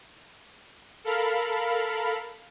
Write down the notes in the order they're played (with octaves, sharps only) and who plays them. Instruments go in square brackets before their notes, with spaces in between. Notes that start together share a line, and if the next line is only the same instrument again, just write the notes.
[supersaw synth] A4 A#4 F5 B5